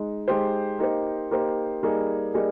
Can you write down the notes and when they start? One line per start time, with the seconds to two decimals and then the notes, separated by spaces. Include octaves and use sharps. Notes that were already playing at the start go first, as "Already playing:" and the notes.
Already playing: G#3 D#4
0.28 G#3 D#4 G4 C5
0.79 A#3 D#4 G4 C5
1.31 A#3 D#4 G4 C5
1.83 G3 A#3 D#4 G#4
2.34 G3 A#3 D#4 G#4